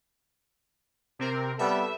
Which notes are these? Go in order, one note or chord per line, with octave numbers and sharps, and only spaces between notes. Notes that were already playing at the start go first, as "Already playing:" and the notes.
C3 C4 A#4
G3 B3 A4 E5